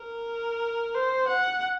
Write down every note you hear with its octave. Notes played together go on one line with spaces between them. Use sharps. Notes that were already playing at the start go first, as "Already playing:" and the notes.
Already playing: A#4
C5
F#5